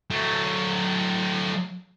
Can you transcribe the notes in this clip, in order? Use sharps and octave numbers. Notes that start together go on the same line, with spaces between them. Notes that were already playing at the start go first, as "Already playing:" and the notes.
F#3 A3